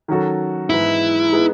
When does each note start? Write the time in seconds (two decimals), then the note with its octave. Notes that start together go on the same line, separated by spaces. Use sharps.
0.08 D#3 F#3 C#4 F#4 A4
0.70 G#2 E3 G#3 B3 E4
1.32 G#3 B3 D#4 G#4